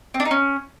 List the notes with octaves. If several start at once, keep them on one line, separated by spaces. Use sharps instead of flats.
C4
D4
D#4
C#4